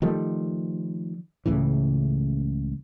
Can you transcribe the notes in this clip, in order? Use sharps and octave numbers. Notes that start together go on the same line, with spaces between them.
D#3 F3 G3 A3
C#2 A2 C#3 E3